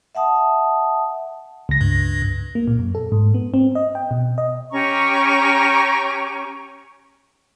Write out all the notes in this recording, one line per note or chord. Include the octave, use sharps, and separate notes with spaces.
E5 F#5 A5 D#6
C#2 A#6
G2
A#3
A#2
F#2
A4
G#2
B3
C4
D#5
G5
B2
D#5
C#4 G4 A#5 C#6